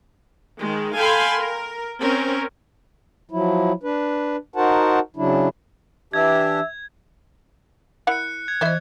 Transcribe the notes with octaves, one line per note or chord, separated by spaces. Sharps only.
D#3 G#3
A4 F5 G5 G#5 B5 C6
A#4
C4 C#4 A#4
F3 F#3 E4
D4 B4
D#4 F#4 A#4 C5 F#5 A5
C#3 F#3 D4 E4
E3 D4 G4 E5 G#6
E4 A#4 F#5 F#6 C#7
G#6
E3 E4 C5 D#5 E5